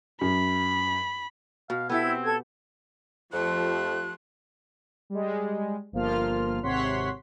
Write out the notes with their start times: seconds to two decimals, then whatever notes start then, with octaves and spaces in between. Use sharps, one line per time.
0.21 F#2 B5
1.70 B2 F5
1.89 B3 E4 G4 A4 G#6
2.04 C4
2.24 A4 G#6
3.33 F2 F3 A3 G4 C6 F#6
5.10 G3 G#3
5.92 G1 F3 A#3 F4 F6
6.63 G#1 C3 C#5 F#5 C6 B6